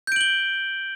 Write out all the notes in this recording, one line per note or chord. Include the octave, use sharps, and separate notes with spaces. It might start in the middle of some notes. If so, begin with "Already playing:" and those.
G6 D7 F#7 G7